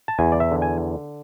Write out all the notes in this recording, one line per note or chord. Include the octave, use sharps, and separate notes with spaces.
A5
E2 G#5
D5
E5
D3
G#5